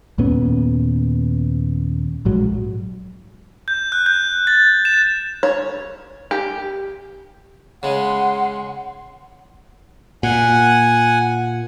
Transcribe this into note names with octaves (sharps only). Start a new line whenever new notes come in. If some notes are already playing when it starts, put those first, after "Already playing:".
D#2 A#2 B3 C#4
A#1 G#2 F#3
G6
F#6
G6
A6
E7
C#5
G4
C#3 G#3 F#5 C6
A#2 F#5 G#5